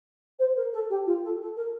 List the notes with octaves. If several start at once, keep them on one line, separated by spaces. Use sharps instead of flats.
C5
A#4
A4
G4
F4
A4
A4
A#4